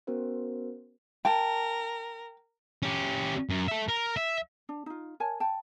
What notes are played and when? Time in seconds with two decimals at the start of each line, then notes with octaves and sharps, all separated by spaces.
0.07 B3 C#4 F#4 A#4 C5
1.25 A#4 G5 A5
2.83 C#4 G4
3.50 F#2
3.68 A4 E5
3.89 A#4
4.17 E5
4.69 D4
4.86 D#4 F4
5.20 A#4 C#5 G#5 A5
5.40 G5 A5